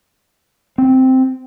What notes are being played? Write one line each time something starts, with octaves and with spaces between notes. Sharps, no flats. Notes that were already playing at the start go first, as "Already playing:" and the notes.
C4